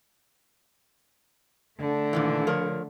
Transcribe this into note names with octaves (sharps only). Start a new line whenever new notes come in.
D3 A3
A#2 D#3 E3
F3 A#4 C#5